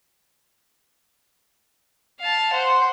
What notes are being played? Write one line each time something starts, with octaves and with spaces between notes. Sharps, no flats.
F5 A5
C5 F#5